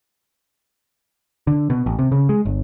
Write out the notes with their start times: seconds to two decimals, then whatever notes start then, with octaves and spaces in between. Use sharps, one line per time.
1.47 D3
1.70 B2
1.86 A1
1.99 C3
2.12 C#3
2.29 G#3
2.45 G1